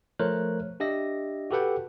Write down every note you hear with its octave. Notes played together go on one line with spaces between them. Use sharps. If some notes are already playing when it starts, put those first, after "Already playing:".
F3 A3 A#4 C5 C#5 F#6
D4 G4 D#5 E5 A#6
F#4 G4 A4 B4 F#5 G5